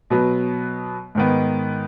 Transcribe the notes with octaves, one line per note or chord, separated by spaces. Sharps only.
B2 F#3 B3
G#2 D#3 B3